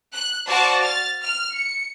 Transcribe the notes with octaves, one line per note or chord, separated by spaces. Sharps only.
F#6
F#4 C5 D5 F5 A5 D6
F6 A6
F6
C#7